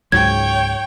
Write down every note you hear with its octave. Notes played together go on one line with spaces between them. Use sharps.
C#2 G#2 F#3 C#5 G5 G#6